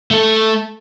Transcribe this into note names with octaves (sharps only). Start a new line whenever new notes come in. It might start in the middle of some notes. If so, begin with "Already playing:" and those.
A3 A4